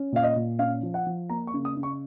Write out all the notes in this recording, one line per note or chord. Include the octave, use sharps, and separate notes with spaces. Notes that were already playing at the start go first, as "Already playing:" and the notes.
Already playing: C#4
A#2 F5
D#5
A#2
C#4 F5
F3
F#5
F3
A#3 A#5
C#6
C#3
D#6
C#3
C#6